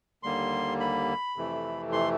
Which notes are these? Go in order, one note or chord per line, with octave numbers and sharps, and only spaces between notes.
D#2 D3 G3 A#3 C6
B5
F2 C3 E3 A3
C6